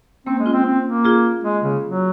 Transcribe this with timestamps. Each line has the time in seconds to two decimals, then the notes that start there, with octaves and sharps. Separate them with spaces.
0.26 A#3 C4 C#4
0.39 G#3
0.46 C#4 F4
0.53 C4
0.65 C4
0.86 A#3
1.05 F4 G#4
1.44 G#3
1.63 C#3
1.84 F#3